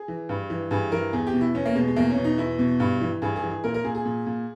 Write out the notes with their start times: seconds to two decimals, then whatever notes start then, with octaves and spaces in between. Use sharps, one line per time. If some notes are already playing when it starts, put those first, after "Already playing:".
Already playing: G#4
0.08 E3
0.29 G2
0.50 E3
0.71 G2 G#4
0.92 E3 A#4
1.13 E2 G#4
1.27 G4
1.34 B2
1.41 E4
1.55 E2 C#4
1.66 A#3
1.75 B2 G#3
1.88 G#3
1.96 E2 A#3
2.10 C#4
2.17 B2
2.24 D#4
2.38 E2 E4
2.59 B2
2.80 G2
3.01 E3
3.22 G2 G#4
3.36 G#4
3.43 E3
3.50 G#4
3.64 A#2 A#4
3.74 A#4
3.84 A#2 G#4
3.95 G#4
4.05 A#2
4.26 A#2